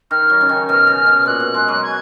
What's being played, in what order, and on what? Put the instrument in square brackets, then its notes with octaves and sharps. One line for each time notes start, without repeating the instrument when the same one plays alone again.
[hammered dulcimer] D#3 [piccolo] F6
[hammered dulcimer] F#3
C#3
D#3
[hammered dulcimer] B2 [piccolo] F6
[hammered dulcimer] C#3
B2
[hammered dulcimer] A#2 [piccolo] F#6
[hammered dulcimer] B2
G#3
F#3
[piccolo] G#6